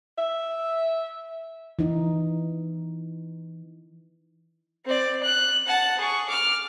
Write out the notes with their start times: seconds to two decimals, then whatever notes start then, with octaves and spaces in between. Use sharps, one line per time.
0.18 E5
1.79 E3 D#4
4.85 C4 D5
5.23 F#6
5.67 F#5 A5
5.99 G#4 C#6
6.28 D6 F6